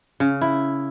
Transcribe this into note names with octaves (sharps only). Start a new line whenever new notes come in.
C#3
E4